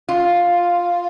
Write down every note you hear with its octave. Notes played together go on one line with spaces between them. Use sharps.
F4